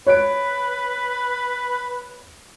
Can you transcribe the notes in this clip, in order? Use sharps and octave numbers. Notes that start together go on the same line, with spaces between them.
B4 C#5 F#6 D7